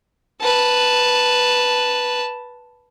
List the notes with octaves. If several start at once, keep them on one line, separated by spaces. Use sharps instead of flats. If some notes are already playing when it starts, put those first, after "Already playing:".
B4 A5